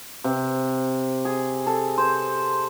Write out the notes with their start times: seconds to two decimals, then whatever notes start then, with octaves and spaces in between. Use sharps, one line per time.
0.24 C3
1.25 G#4
1.67 A4
1.98 C5